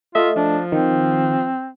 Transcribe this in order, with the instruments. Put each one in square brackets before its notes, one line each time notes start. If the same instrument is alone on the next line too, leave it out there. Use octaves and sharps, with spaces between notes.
[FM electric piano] A3 D#5 [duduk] F4 [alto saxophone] E5
[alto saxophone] F3 [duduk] D4
[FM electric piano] D#3 [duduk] C4